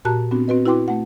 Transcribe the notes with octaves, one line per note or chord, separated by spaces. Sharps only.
A#2 F#4 G4 A5 A#5 F#6
B3 C4 D4 F#4
C4 F#4 B4 D#5
E4 F#4 B4 G5 C6 D6
A3 F#5